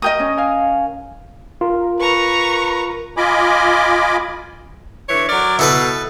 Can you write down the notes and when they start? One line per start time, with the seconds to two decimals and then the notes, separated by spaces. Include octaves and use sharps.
0.02 A#4 D#5 G5 D#6
0.19 C#4
0.38 F5 G#5
1.61 F4 A#4
2.00 B4 A#5 C#6
3.16 F4 D#5 G#5 B5 D6
5.09 D3 E3 C#5
5.29 F#3 A#4 D5
5.59 B2 E4 A4 B4